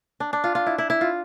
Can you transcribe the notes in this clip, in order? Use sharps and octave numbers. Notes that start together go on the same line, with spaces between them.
D4
D4
F4
F4
E4
E4
E4
F4